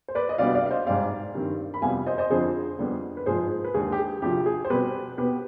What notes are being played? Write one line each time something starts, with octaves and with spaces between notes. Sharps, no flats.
C5
B4 D5
D#5
D2 C3 G3 B3 D5 F5
D5 F5
F5
C5 D#5
G#2 G3 C4 D5 F5
G2 D#3 G3 C4
B5
F2 C3 G3 B3 F5 G#5
C5 D#5
C5 D#5
F2 D3 F3 C4 G#4 C5
F2 D3 G3 B3
B4
G#2 F3 G#3 G#4 C5
B4
D#2 D3 G#3 G#4
G4
G#4
D2 C3 F3 C4 G4
G#4
C5
B2 G3 C4 G4 B4
B2 B3 G4 B4